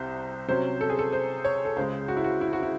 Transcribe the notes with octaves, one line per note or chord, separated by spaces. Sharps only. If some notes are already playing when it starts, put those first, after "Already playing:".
Already playing: C2 C3 C5
C3 F#3 C#4 C5
A4
G#4
A4
C5
C#5
A4
C#2 C#3 G#3 C5
F#4
E4
F#4
E4
F#4
E4